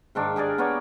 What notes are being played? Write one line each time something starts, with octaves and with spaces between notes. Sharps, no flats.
G#2 D#3 D4 F5
G4 G#4 A#4 D5
B3 A#4 C#5 D5